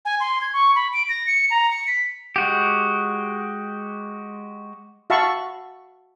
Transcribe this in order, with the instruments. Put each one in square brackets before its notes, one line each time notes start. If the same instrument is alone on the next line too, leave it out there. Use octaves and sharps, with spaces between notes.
[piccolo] G#5
C6
G#6
C#6
B5
D7
A#6
C#7
A#5
C#7
B6
[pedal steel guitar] G#3 F#4 G4
[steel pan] F#4 E5 F5 A5 B5 C#6